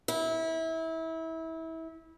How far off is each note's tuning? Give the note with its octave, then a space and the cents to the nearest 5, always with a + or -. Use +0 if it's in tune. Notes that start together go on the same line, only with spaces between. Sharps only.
E4 -25